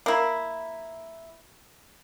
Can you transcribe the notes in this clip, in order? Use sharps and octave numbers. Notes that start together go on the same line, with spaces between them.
A#3 E4